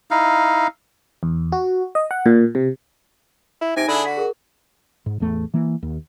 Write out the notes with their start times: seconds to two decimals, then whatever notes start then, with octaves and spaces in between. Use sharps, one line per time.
0.11 D#4 E4 F5
1.23 E2
1.52 F#4
1.95 D#5
2.11 F#5
2.26 A#2
2.55 C3
3.61 E4
3.77 C3 D#4 G#5 A#6 D7
3.88 D3 D4 E4 G#4 B5 G#6
4.05 F#4 B6
4.17 G#4 A#4
5.06 G#2
5.20 A1 E2 A3
5.54 E3 A#3
5.83 D#2